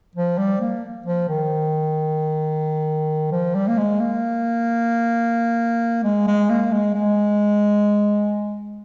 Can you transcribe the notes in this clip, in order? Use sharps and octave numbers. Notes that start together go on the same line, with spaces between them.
F3
G3
A#3
F3
D#3
F3
G3
A#3
G#3
A#3
G#3
G#3
A#3
G#3
G#3